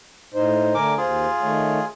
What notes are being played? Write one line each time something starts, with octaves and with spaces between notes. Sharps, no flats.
A2 D#4 C5
D3 A3 A#4 G#5 D6
D#2 F4 G#4 C5
D#3 A3 C#5